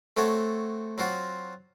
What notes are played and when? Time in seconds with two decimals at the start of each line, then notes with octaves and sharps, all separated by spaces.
0.17 A3 C4 F#4 A4 C#5
0.98 F#3 C4 F4 F#4